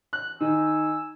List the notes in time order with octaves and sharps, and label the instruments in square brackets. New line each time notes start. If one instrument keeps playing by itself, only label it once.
[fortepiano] F#6
[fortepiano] D#3 D#4 [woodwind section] G#5 E6